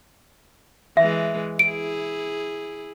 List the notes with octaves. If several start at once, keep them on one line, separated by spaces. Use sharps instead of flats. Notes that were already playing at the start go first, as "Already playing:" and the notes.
E3 G#3 E5
E4 G#4 D7